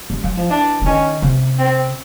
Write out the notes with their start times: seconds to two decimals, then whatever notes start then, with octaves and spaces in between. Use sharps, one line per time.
0.10 G3
0.24 F#3
0.37 F3
0.49 E3 D4
0.82 E3
0.86 D#3 C#4
1.22 C3
1.59 C4